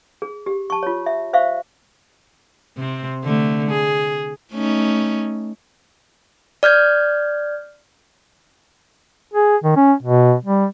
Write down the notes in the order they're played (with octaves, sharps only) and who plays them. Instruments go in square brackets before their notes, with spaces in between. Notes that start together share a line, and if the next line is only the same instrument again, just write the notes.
[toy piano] G#4
G4
A5 C#6
F4 C#5
E5
C5 E5 F5 C#6
[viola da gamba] C3 C4
D3 A3
G#4
A3 C#4 D#4
[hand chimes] D5 F6 G6 G#6
[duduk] G#4
D#3
C#4
B2
G3